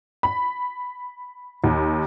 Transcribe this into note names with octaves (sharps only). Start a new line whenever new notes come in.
B5
D#2